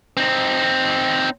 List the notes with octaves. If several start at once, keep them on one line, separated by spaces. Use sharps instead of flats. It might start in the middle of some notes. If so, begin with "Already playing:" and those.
C4 D#4